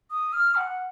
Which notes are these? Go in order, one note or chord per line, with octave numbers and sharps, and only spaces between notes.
D#6
F6
F#5